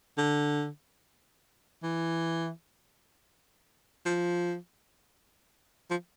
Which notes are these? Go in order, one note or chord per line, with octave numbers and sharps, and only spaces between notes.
D3
E3
F3
F3